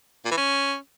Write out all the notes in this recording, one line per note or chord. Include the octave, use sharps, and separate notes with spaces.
A#2
E3
C#4